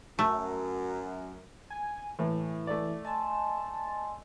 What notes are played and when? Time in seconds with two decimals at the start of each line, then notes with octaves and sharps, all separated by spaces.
0.19 F#2 A3
1.70 G#5
2.19 A2 E3
2.67 A3 D5
3.05 D#5 G#5 A5 C6